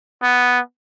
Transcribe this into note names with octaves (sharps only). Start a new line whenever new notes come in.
B3